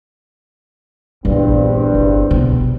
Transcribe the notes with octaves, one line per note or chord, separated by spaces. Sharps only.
A#1 E2 G2 C4
G1
B2